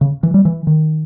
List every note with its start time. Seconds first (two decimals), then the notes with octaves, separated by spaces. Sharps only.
0.01 C#3
0.23 E3
0.34 G3
0.45 E3
0.67 D#3